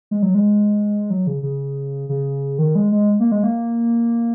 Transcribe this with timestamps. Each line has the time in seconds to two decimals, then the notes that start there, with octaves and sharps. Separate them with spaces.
0.11 G#3
0.23 F#3
0.35 G#3
1.10 F#3
1.27 C#3
1.43 C#3
2.09 C#3
2.59 D#3
2.75 G#3
2.92 G#3
3.20 A#3
3.32 G#3
3.43 A#3